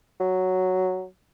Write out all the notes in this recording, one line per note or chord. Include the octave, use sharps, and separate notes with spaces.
F#3